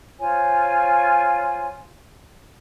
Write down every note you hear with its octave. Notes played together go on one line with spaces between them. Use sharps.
F4 C5 C#5 G#5